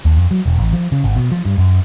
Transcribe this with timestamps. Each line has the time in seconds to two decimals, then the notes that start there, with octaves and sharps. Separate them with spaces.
0.05 D#2
0.17 F2
0.31 F#3
0.46 E1
0.59 A1
0.73 F3
0.92 C#3
1.04 G#1
1.16 B2
1.32 F3
1.45 G2
1.58 F#2